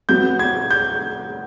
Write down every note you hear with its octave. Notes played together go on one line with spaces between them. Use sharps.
A2 F#3 B3 G6
G#6
G6